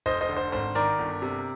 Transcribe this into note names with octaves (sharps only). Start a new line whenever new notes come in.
F1 C5 D#5
C5 D#5
D3
C5
G#1 C5
D#3 A#4 D5
G1
C3